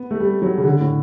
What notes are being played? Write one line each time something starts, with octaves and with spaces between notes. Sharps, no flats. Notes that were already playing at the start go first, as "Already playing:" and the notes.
Already playing: B3
A3
G3
F#3
C#3
D3
A2